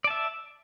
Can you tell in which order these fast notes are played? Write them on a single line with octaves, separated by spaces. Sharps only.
D5 A5 E5